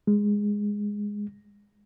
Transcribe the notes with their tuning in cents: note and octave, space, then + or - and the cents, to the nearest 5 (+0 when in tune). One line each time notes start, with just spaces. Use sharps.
G#3 -10